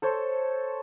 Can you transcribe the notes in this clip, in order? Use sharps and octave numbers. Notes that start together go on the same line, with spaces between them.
A4 C5 C#5